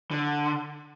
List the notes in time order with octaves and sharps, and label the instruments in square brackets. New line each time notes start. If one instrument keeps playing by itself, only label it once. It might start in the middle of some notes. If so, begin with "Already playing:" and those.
[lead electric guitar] D3